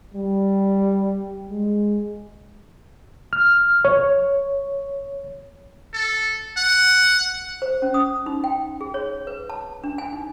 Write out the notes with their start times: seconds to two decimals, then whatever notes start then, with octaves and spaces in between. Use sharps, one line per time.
0.14 G3
1.50 G#3
3.33 F6
3.85 C#5
5.93 A4
6.57 F#5
7.62 C5
7.82 C#4
7.94 D#6
8.26 D#4
8.44 G5
8.81 G#4
8.94 C#5
9.27 B4
9.50 A5
9.84 D4
9.98 G#5
10.13 D#4